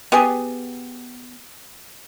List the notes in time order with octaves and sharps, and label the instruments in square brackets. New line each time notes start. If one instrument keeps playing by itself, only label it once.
[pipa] B3 G4 G#4